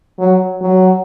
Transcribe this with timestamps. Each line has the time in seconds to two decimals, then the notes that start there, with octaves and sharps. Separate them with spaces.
0.19 F#3
0.61 F#3